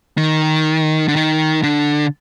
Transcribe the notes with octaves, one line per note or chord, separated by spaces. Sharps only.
D#3
D3
D#3
D3